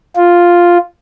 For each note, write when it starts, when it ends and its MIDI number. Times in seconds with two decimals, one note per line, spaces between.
0.16 0.77 65